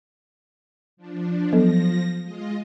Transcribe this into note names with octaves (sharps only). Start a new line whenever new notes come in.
F3 D4
F3 F#3 B3 A4 A#6
G#3 F4 D#5